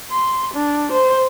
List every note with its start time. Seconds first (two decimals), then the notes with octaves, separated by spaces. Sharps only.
0.11 C6
0.54 D4
0.92 C5